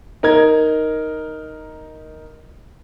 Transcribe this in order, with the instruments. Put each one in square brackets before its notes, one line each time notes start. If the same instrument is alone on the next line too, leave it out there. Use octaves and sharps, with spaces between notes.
[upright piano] D#4 A#4 G#6